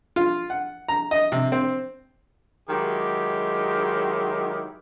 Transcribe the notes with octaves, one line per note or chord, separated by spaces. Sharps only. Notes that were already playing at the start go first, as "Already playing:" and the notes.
F4
F#5
A#5
D#5
C3
C4
D#3 F#3 G#3 E4 G4